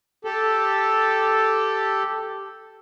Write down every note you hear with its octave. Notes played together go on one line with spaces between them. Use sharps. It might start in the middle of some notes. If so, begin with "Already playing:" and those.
G4 A4